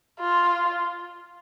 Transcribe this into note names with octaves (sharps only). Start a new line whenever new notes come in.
F4